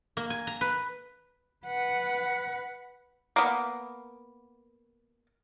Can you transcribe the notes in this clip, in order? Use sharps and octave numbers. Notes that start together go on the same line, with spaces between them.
A#3
G#5
A#5
B4
B4 F#5
A#3 B3